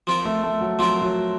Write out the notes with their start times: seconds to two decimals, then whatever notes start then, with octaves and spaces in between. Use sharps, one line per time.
0.07 F3 C4 F4 A#4
0.25 A3
0.43 A3
0.61 F#3
0.79 F3 F#3 C4 F4 A#4
1.02 F#3